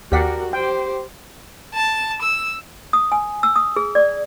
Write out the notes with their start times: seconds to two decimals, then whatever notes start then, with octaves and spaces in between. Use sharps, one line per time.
0.12 D#2 F#4 G4 A#4 D5 F#5 B6 C7
0.53 G4 C5 G5
1.74 A5
2.22 E6
2.93 D#6
3.12 G#5
3.43 E6
3.56 D#6
3.76 G#4
3.95 D5